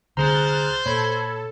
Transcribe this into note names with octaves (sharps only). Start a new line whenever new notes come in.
C2 D3 G#4 C5 A#5 F6 F#6 A6
A#2 A4 C#5 B5 G#6